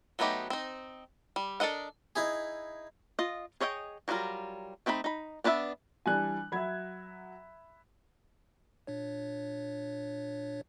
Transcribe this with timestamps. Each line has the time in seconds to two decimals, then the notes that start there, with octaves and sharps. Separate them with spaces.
0.19 F#3 A3 B3 D#4 G4
0.50 C4 D#4
1.36 G3
1.60 D4 A4 A#4 D#5 F#5
2.16 D#4 E4 G#4
3.19 F4 D#5
3.60 G#4 C#5 D#5 E5 G5
4.08 F#3 G3 D4 F4 A#4
4.86 A3 C4 D#4 F#4 B5
5.04 D#4 B5
5.44 B3 D4 B4 C5 E5
6.06 E3 G3 D4 G#5 F#6
6.52 F#3 E5 B5 G#6
8.87 A#2 D4 C#5